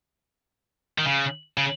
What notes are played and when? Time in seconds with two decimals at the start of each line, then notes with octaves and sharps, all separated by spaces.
0.98 D#3
1.06 C#3
1.57 C#3